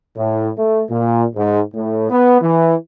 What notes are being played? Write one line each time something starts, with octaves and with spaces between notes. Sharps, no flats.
A2
A3
A#2
G#2
A2
B3
E3